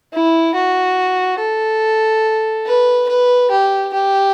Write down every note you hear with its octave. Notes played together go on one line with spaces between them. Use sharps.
E4
F#4
A4
B4
B4
G4
G4